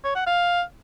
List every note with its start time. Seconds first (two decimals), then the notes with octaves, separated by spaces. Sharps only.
0.04 C#5
0.15 F#5
0.27 F5